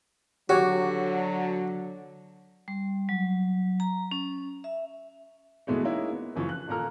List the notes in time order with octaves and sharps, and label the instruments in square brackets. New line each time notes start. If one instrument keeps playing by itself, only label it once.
[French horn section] D3 F#3 [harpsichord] F#4 [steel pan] G4 C#5
[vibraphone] G3
F#3
A#5
C#4
E5
[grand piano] B2 E3 G#3 A3 B3
G#3 A#3 C#4 D#4 E4
B3
F#1 E3 F3 C#6
F#6
D#1 A#2 A#3 A4 A#5 F6